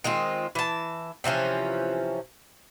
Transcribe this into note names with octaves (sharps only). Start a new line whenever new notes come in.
D#3 G#3 C4 F4
E3 A5
C3 E3 F3 C#4